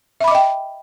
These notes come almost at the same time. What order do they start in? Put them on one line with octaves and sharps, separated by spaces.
E5 B5 D6 D#5 G5